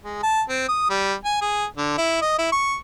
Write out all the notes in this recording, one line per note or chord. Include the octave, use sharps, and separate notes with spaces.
G#3
A5
C4
D#6
G3
G#5
G#4
D3
E4
D#5
E4
C#6